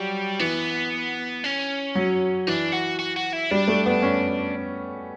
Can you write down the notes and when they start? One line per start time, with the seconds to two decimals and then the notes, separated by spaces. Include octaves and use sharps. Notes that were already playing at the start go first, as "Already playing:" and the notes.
Already playing: F#3 G3
0.39 E3 B3
1.44 C#4
1.95 F#3
2.47 E3 D4
2.73 F#4
2.99 F#4
3.17 F#4
3.33 E4
3.51 G3 D4
3.68 A3
3.86 B3
4.02 C#4